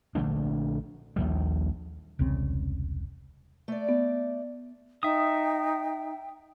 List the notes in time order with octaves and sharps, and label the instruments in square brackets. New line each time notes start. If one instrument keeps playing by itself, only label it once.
[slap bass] A#1 D3 A3 D4
A#1 D#2 G3
[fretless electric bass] E1 C2 C#3 C4
[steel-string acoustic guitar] A3 D5
[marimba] B3
[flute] D#4 [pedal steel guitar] E5 D#6 [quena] G5